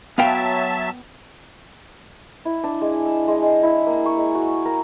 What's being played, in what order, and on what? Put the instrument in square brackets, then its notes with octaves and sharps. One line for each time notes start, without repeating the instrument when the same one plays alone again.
[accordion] F#3 E5 A5 [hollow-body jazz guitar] B3 F5 G5
[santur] E4
D4
G#3
E6
G#3
G#3
E4
A#3
C#6
G#3
F#4
A#4